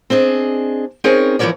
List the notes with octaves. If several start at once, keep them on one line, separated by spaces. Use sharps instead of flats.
C4 D4 G#4 D#5
C4 C#4 D#4 G#4 A#4 C#5
E3 F3 A3 A#4 C#5 D5